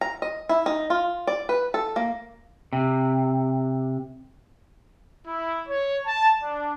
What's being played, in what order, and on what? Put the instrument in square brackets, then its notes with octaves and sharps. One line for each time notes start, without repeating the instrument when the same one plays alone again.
[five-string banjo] A#5
D#5
E4
D#4
F4
D5
B4
A4
A#3
[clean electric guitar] C3
[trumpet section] E4
C#5
A5
D4